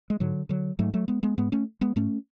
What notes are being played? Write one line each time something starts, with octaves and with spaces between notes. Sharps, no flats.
G#3
G#2 D3 F#3
D3 F#3
G#2 F#3 A3
F#3 A3
G#3 B3
G#3 B3
G#2 G#3 B3
A3 C#4
G#3 B3
G#2 A3 C#4